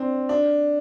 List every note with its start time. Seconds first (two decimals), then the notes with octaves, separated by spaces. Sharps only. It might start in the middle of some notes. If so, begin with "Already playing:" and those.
Already playing: C4 D4
0.29 D4